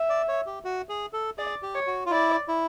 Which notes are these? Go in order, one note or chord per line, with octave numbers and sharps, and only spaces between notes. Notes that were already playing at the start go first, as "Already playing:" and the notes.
Already playing: E5
D5
C#5
G4
F#4
G#4
A4
G#4 D5
G4
C#5
F#4
F4
E4 D5
E4